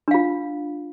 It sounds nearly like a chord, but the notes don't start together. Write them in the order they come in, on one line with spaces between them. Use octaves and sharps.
D4 F5 F4